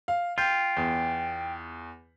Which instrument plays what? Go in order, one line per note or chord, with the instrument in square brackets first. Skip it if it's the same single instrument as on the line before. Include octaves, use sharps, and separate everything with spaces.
[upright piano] F5
[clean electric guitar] F4 [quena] G5 [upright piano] G6
[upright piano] E2